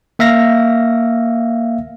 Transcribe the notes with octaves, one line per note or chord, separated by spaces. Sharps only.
A#3 E5 F5 A#6